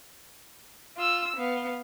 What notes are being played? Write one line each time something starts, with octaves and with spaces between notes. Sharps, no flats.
F4 E6
B3 F5